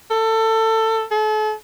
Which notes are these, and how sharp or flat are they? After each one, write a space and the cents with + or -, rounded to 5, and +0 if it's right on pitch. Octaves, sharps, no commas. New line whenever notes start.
A4 +20
A4 -40